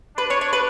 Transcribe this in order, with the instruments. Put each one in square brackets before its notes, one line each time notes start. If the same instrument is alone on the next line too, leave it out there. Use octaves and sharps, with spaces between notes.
[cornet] D4 [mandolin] B4
[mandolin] C#5
C#5
B4